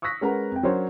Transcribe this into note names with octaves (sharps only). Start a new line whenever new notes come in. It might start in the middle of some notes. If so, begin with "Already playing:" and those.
C#6 D#6 E6 F#6 A#6 B6
G#3 C#4 A#4 B4 F#5 A#5
F2 G5
F#3 C#4 D4 A#4 C5 C#5